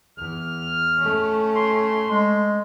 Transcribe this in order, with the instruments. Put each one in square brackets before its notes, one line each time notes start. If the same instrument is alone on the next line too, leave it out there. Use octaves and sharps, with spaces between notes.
[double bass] E2 [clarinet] F6
[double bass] A3 C#4
[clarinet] C6
G#3